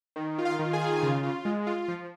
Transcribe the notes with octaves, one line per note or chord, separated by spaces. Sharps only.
D#3
F4
F5
D#3
G#4 G#5
F4
C#3
F4
G#3
F4
F3